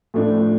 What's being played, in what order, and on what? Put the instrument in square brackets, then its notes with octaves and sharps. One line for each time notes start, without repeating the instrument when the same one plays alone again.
[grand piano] A2 F3 A3 D4